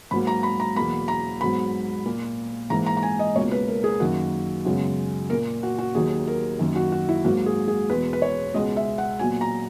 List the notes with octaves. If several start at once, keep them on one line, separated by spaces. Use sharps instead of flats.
G#2 F#3 A#3 B5
A#5
B5
A#5
E2 B2 F#3 A#3 B5
A#5
G#2 F#3 B3 B5
A#2 A#3
G#2 E3 A#3 A#5
A#5
A#5
G#5
D#5
C#2 B2 A#3 C#5
B4
A#4
G#4
F#2 D#3 A#3 F#4
F#2 C#3 G#3 B3
A#2 A#3 A#4
F#4
F#4
D#2 D#3 F#3 G#4
A#4
F#2 D#3 A#3
F#4
F#4
E4
G#2 F#3 A#3 F#4
G#4
G#4
E2 B2 G#3 B4
B4
C#5
C#2 B2 G#3 B3 D#5
E5
F#5
A#2 F#3 B3 G#5
A#5